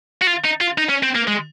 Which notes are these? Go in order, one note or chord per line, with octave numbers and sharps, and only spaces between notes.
F#4
F4
D#4
F4
D#4
C#4
C4
A#3
G#3